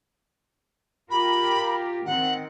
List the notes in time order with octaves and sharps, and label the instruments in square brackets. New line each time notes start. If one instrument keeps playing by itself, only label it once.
[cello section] F4 G4 A#4 [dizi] B5
[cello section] D#3 C4 [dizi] F#5